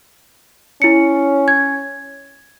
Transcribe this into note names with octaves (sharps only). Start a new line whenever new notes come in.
C#4 E4 C#7
G#6